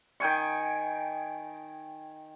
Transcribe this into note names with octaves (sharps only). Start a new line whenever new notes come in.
D#3 G5 G#5 C#6